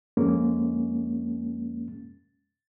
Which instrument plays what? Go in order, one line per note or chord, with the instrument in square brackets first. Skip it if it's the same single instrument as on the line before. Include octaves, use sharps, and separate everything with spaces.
[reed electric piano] F2 G#3 A#3 C#4